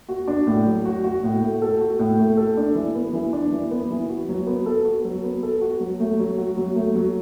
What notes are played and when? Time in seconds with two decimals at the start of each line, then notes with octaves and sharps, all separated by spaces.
0.09 F#4
0.27 D4
0.47 A2
0.66 F#3
0.85 F#4
1.04 F#4
1.23 A2
1.42 A3
1.62 A4
1.81 F#4
1.99 A2
2.18 A3
2.37 A4
2.57 D4
2.75 E3
2.95 B3
3.13 E3
3.33 D4
3.52 E3
3.71 B3
3.90 E3
4.09 F#4
4.29 F#3
4.47 B3
4.66 A4
4.85 F#4
5.05 F#3
5.23 B3
5.43 A4
5.61 F#4
5.80 F#3
6.00 A3
6.19 F#3
6.38 F#4
6.57 F#3
6.76 A3
6.95 F#3